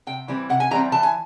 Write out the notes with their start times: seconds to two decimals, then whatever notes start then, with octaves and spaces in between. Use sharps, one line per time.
0.07 C3 G5
0.28 E3 G3 C4
0.49 C3 F#5
0.60 G#5
0.71 E3 G3 C4 A#5
0.92 E3 A5
1.03 G#5